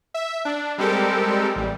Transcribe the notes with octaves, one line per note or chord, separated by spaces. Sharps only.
E5
D4
G3 G#3 C4 G4 A4 A#4
A1 G3